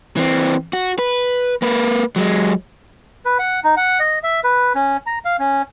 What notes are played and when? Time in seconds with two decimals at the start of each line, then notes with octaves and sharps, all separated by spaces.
0.17 E3 C4
0.73 F#4
0.99 B4
1.62 A#3 B4
2.16 F#3 G#3
3.25 B4
3.39 F#5
3.64 D#4
3.77 F#5
4.00 D#5
4.23 E5
4.44 B4
4.75 C#4
5.07 A#5
5.25 F5
5.39 C#4